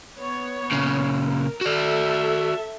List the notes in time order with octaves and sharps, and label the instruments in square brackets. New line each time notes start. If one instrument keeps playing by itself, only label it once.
[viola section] B3 C#5
[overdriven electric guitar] A#2 C#3
[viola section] A#4
[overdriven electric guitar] F#4 D5 [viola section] A4 E5